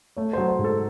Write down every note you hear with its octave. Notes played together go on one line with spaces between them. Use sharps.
A3 C#5
F#3 C5
C5
G#2
A4